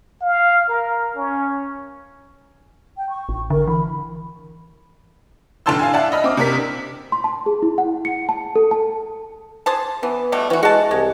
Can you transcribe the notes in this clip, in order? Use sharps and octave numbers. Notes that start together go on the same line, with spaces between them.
F5
A#4
C#4
G5
C#6
A1
D3 A#4
E3 B5
F1 A2 D3 A5 C6 E6
F5 G#5
D5 E5 F#5 A5
D#5 B5 F6
C4 D6 D#6
C3 D4 A#4 B6
C6
A5
G#4
E4
F#5
C#7
A5
A4
A5
G#4 C5 A5
E3 B3
B2 G3 A3
E3 C#4 F#4
G#3 F#4 A5
C2 G#3